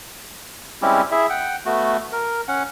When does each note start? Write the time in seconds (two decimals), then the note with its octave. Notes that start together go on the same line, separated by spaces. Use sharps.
0.82 G3 G#3 C4 C#4 E4 G4
1.12 E4 G#4 E5
1.30 F#5 G5
1.66 A3 B3 F#4
2.12 A#4
2.48 C#4 F#5